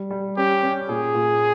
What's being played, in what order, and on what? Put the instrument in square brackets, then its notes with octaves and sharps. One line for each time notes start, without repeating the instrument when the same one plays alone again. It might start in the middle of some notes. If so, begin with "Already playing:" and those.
Already playing: [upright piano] G3
G3
[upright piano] C#4 [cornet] G4
[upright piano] C#4
[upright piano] A#2 [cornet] G#4
[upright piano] A#2